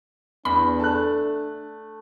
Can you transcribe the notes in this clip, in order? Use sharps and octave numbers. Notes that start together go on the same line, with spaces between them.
E2 D4 B5
A3 A5 F#6